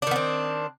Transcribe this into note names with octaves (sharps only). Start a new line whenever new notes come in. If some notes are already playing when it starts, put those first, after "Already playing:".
D#3 B3 C4 D4